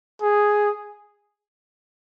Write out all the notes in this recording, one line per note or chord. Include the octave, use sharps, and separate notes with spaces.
G#4